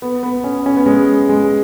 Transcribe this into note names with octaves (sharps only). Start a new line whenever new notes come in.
B3
B3
C#4
C#4
B3
G#3
G#3